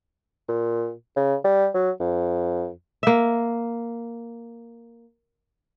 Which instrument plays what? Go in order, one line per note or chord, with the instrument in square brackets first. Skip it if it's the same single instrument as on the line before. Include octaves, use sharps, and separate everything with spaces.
[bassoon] A#2
C#3
G3
F#3
F2
[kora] A#3 E5